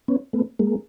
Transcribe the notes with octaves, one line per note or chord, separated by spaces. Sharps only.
B3 C#4
A3 B3
G#3 A#3